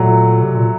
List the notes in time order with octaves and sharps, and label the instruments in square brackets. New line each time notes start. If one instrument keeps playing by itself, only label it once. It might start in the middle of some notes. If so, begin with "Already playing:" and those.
Already playing: [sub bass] A#2 [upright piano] F#3 A3
[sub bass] C3
A#2